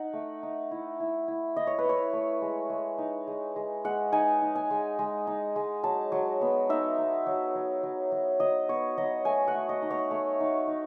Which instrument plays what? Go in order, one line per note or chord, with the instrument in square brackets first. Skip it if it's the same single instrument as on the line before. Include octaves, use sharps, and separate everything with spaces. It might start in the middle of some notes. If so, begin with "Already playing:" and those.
Already playing: [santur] D#4 F#5
A3
D#4
E4
E4
E4
E4 D#5
C#5
B4
E4 C#5
A3
G#3
G#3
D#4
G#3
G#3
G#3 F#5
D#4 G#5
D#4
G#5
G#3
G#3
D#4
G#3
F#3 A5
F#3
B3
D#4 E5
D#4
F#3
F#3
F#3
F#3
F#3 D#5
B3 C#5
F#3 D#5
A3 G#5
F#5
A3
D#5
D#4
C#5
A3
D#4
D#4